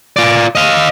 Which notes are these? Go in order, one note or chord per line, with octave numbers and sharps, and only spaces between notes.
F4 D5
D#5 F5